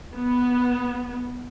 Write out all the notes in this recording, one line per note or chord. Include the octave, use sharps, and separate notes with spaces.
B3